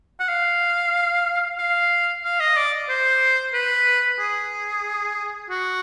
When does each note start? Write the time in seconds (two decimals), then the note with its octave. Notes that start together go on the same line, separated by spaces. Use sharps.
0.20 F#5
0.29 F5
1.58 F5
2.24 F5
2.40 D#5
2.57 D5
2.89 C5
3.54 B4
4.19 G#4
5.50 F#4